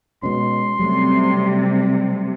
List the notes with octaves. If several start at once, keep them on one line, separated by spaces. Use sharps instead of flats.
B2 G#3 C#4 C6
C3 F#3 G3 A3 C#4